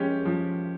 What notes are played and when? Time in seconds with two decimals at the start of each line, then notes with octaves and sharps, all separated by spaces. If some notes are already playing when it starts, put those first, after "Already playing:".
Already playing: F3 G#3 C#4 G4
0.25 F3